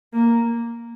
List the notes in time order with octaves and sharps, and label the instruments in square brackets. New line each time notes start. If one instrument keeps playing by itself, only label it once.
[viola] A#3